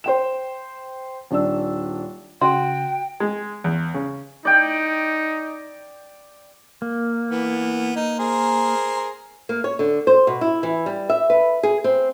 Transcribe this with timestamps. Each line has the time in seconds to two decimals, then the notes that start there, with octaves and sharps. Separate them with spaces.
0.04 C5 G5 E7
1.31 D#1 D4 E6
2.41 C#3 F#4 G5 C6
3.20 G#3
3.64 E2
3.94 C#3
4.45 D#4 D5 G5
6.82 A#3
7.31 E3 B3
7.96 D#4
8.19 G#4 A#4 C5
9.49 A#3
9.64 C#5
9.79 D3
10.07 C5
10.27 B2
10.41 E4
10.63 E3
10.86 G3
11.10 E5
11.30 B4
11.63 G#4
11.84 C4